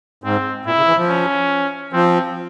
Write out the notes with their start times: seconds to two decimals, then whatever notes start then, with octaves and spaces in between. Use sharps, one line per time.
0.24 G#2 C4
0.66 A#2 E4
0.76 C#3
0.87 E3
0.97 F3
1.09 C#4
1.93 F3 C4